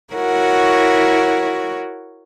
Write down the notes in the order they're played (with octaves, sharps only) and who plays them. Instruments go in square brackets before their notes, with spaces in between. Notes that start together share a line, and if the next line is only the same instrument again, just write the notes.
[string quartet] E4 F#4 A#4 C#5 F#5